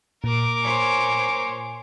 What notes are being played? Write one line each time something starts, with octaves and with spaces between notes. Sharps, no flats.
A#2 A#4 D6
C5 C#5 G#5